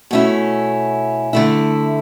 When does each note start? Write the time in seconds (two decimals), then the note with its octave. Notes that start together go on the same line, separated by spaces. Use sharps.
0.11 B2 A3 C#4 E4
1.33 D3 A3 E4